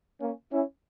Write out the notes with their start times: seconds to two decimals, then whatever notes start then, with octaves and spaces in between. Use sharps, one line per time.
0.20 A#3 C#4
0.51 C#4 E4